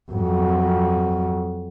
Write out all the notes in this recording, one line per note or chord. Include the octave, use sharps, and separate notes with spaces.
F2 F#3